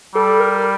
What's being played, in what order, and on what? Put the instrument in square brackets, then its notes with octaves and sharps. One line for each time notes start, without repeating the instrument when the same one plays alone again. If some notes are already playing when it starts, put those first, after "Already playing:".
[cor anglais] G3 [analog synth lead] A4
[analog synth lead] A#4